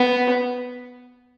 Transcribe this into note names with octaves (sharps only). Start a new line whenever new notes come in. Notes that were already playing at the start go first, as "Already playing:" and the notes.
Already playing: B3